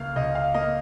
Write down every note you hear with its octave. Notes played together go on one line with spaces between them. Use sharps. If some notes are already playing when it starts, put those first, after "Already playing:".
Already playing: C#2 A#3 F5
C#2 D#5
F5
A#3 D#5